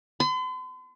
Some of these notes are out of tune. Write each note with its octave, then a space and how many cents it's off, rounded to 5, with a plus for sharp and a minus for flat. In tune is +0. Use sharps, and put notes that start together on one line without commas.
C6 -45